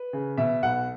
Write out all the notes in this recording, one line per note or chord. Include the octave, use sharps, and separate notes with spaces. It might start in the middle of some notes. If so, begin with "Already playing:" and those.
Already playing: B4
C#3
B2 E5
B1 F#5